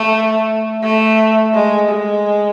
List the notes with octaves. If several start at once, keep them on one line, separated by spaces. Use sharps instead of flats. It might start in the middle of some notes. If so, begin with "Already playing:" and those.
Already playing: A3
A3
G#3
G#3